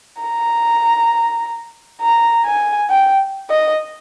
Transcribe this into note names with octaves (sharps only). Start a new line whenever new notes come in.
A#5
A#5
G#5
G5
D#5